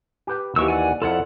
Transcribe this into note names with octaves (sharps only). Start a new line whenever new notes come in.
G4 B4 G5
D#2 E3 F#4 G4 C#6 E6
D5 F#5 G#5
F2 E4 F4 A4 D5 F#5